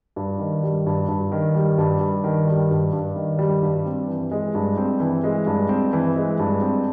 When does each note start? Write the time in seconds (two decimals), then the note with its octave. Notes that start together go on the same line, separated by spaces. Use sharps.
0.16 G2
0.39 D#3
0.63 G3
0.86 G2
1.08 G2
1.32 D#3
1.54 G3
1.78 G2
2.01 G2
2.24 D#3
2.47 G3
2.71 G2
2.93 G2
3.16 D#3
3.39 G3
3.62 G2
3.86 C4
4.08 E3
4.31 G#3
4.55 G2
4.78 C4
5.00 E3
5.24 G#3
5.47 G2
5.69 C4
5.93 E3
6.16 G#3
6.39 G2
6.62 C4